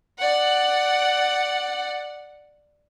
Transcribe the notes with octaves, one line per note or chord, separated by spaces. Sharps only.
D5 F#5